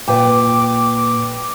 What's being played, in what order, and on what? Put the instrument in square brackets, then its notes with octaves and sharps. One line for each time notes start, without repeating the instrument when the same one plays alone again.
[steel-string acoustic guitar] A#2 [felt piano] B4 G5 [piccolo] D6